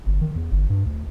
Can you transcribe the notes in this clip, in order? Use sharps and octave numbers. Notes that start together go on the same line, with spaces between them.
G1
D#3
E2
G1
G2
D2